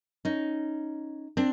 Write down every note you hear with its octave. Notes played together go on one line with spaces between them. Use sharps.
C#4 D#4
C4 D4